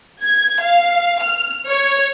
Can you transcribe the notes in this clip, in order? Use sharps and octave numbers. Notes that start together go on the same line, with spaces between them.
G#6
F5
F6
C#5